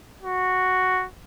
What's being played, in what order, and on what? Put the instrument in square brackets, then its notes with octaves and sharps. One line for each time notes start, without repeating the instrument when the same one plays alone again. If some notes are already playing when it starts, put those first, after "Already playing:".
[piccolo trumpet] F#4